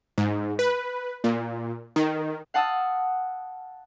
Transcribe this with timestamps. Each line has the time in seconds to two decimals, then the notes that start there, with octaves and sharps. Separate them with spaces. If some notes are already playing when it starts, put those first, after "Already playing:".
0.18 G#2
0.59 B4
1.24 A#2
1.96 D#3
2.54 F5 F#5 A5 D#6 E6